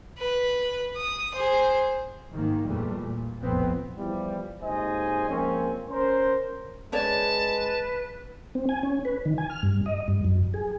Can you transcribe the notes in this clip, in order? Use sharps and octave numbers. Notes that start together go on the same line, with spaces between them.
B4
D#6
G#4 C5
G#2 D#3 A#3
E2 A#2 G3 A3
A#2
F1 B1 F2 A#2 B3 C4
E2 E3 F3 G3
G#1 D#2 G#3 C5 D#5 G#5
F3 G#3 A#3 C4 C#4
C#4 A#4 C5
G#3 C#4 B4 C#5 D5 A5
C4
G#5
C#4
B4
D#3
G#5
F6
G2
D#5
G2
F#2
G#4